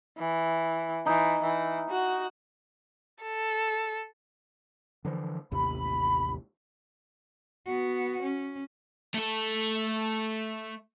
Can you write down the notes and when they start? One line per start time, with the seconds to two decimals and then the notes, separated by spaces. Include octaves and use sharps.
0.18 E3
1.06 E3 D#4
1.42 E3
1.90 F#4
3.22 A4
5.05 D3 E3 F3
5.51 A1 D#2 C3 B5
7.66 B3 F#4
8.22 C#4
9.15 A3 A4